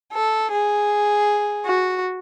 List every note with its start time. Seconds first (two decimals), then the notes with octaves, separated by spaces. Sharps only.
0.12 A4
0.51 G#4
1.66 F#4